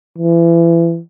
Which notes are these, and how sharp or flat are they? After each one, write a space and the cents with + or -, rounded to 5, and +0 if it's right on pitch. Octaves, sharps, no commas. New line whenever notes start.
E3 +30